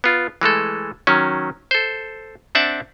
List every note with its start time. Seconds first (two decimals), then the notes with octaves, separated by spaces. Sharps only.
0.04 B3 F4
0.41 E3 G#3 A3 A4
1.07 D#3 F#3 C#4
1.71 A4 C5
2.55 C4 D4 E5 F#5 A5